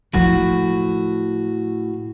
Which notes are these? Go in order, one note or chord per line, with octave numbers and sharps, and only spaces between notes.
A2 F3 F4 F#4